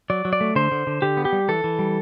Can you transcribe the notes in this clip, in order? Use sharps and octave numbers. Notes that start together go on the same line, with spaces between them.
F#3 D5
F#3
D5
A3
D3 C5
D3
D3
D3 G4
B3
G4
G3
E3 A4
E3
G3